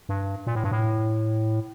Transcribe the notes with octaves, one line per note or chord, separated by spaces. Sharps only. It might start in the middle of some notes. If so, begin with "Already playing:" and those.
G2
A#2
A2
G2
A2